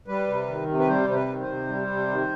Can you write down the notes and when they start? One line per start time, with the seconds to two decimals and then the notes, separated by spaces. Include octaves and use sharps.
0.08 G3 B4
0.28 C3
0.47 D#3
0.68 C3
0.79 B4
0.88 G3 C5
1.08 C3 C5
1.15 B4
1.28 D#3
1.40 C5
1.47 C3
1.67 G3
1.87 C3
2.08 D#3